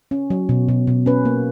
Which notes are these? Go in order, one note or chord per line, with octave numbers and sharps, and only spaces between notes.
C#4
F#3
B2
B2
B2
C#4 B4
A#3